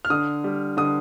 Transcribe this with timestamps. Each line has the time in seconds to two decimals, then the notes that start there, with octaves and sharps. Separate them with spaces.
0.05 F6
0.10 D3 D#6
0.44 G3
0.77 D3 D#6